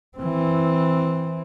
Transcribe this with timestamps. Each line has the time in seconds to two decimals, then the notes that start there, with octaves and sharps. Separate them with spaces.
0.17 E3 C4